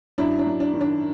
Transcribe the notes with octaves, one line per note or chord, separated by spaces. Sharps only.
F#2 D4 E4
D4
F#2
D4
D#3
D4